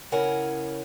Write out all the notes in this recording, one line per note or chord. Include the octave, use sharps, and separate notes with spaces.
C#3 E4 A#4 C#5 F#5 G#5